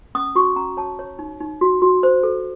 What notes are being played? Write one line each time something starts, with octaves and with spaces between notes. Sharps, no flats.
C#4 D#6
F#4 C#6
C#4 A#5
C#5 A5
C#5
D#4
D#4
F#4
F#4
C5
A4